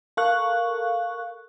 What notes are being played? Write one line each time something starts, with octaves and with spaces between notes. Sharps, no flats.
A4 A#4 F5 C#6 F#6